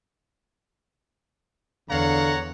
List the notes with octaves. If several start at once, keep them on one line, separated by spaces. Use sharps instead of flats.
E2 D3 C#5 F5 F#5 A#5